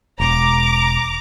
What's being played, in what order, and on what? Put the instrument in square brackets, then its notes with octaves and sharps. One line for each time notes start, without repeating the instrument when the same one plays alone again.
[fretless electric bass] E1 [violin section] A#5 D6